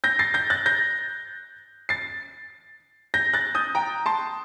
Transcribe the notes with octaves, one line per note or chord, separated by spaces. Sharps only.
G6 A#6
A6 C7
G6 A#6
F#6 A6
G6 A#6
A6 C7
G6 A#6
F#6 A6
D#6 G6
G5 A#5
A5 C6